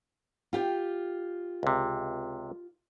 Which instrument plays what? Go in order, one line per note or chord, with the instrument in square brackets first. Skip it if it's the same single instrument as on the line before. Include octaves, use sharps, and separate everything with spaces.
[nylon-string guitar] F4 G4 G5
[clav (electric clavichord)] C#2 C3